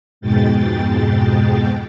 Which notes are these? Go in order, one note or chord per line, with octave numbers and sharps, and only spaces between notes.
F2 G#2 B2 G#3 G5 A6